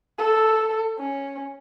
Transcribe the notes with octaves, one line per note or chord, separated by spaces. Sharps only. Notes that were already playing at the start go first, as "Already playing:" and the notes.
A4
C#4